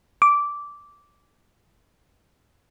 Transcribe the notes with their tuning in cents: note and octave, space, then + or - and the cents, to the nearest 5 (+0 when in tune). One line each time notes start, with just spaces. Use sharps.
D6 -10